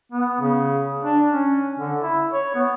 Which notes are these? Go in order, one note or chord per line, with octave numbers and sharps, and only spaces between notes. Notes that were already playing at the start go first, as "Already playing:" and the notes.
B3
C#3
D4
C#4
D3
E4
C#5
B3